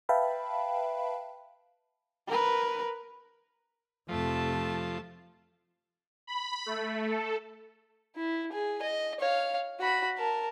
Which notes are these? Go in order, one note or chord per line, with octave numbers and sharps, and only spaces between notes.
B4 E5 F5 G5 A5 B5
A#4 B4
F2 C3 F3 A3 A5
B5
A3
A4
E4
G#4
D#5
C#5 F5
F#4 B5
A#4 A5